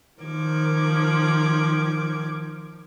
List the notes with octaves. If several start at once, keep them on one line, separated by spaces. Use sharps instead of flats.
D#3 F3 D6 G#6